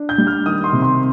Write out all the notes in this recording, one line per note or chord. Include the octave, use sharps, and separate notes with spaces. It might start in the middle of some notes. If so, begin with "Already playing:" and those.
Already playing: D4
G6
G3
F6
D#3 D#6
C6
C3
C6